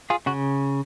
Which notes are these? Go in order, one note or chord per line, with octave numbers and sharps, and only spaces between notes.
F4 G#4
C#3 F#4